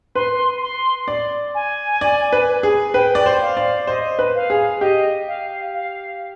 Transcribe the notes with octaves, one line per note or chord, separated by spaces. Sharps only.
B4 C6
C6
D5
G#5
D5
B4
G#4
B4 G5
D5
C5
F5
D5
C5 D#5
B4
F5
G#4
G4 D#5
F5
F5